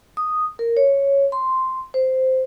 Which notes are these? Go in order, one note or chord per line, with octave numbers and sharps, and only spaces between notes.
D#6
A#4
C#5
C6
C5